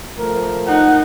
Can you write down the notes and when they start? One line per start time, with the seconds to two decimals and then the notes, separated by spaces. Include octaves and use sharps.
0.18 F3 A3 A#4
0.67 D#4 F#5